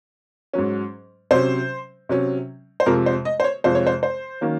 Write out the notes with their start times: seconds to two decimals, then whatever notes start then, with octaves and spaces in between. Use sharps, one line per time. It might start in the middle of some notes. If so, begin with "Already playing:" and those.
0.54 G#2 F#3 C#4
1.31 C3 F#3 C#4 C5
2.09 C3 F#3 C#4
2.80 C5
2.86 F2 C3 F3 G#3 A#4
3.06 C5
3.25 D#5
3.40 C5
3.44 C#5
3.64 F2 C3 F3 G#3 C5
3.75 C#5
3.87 C5
4.03 C5
4.41 D#3 F#3 A#3 C#4